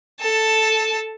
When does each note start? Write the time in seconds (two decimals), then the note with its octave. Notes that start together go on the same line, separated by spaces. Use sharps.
0.21 A4 A5